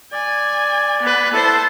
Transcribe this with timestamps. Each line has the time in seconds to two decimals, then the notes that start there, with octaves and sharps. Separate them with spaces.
0.12 D5 G#5
1.02 B3 B4
1.33 E4 A4 C5 A5